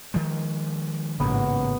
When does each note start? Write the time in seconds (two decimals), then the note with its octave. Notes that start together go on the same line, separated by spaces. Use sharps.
0.14 D#3 F3 G#3
1.20 A1 G#2 C#3 A#3 B3